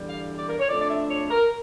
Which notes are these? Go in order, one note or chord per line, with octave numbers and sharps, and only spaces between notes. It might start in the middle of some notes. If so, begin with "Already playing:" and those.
Already playing: E2 D3 G3
F5
D5
A#4
C#5
F2 D3 A3 D4 D5
D5
E5
C#5
A#4